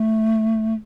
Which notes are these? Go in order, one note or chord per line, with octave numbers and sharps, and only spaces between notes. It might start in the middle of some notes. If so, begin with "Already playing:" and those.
Already playing: A3